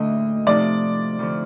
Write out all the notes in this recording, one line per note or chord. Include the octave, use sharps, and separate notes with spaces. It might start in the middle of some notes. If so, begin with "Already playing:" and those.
Already playing: D2 A2 D3 A3 D4 D#5
C3 F3 A3 C4 D#4 D5
F2 D3 F3